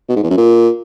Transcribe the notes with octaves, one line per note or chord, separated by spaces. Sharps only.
B2
G#2
E2
F#2
A#2